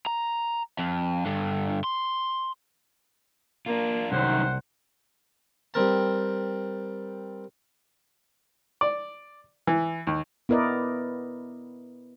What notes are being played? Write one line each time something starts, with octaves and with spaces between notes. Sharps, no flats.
A#5
F2
G2 D3
C6
A#3 D4 F4
C2 F#2 D#3 C5 F#5
G3 C4 A#4 A5
D5
E3
D#2
B3 E4 A#4 B4 D5 D#5